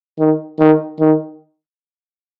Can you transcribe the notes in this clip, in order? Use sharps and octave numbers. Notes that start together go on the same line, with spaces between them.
D#3
D#3
D#3